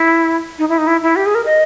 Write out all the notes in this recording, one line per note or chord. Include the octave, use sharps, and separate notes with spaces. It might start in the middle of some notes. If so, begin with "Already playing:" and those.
Already playing: E4
D#4
E4
D#4
E4
E4
G4
G#4
A#4
D#5